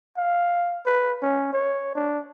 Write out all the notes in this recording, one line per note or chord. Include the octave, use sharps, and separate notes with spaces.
F5
B4
C#4
C#5
D4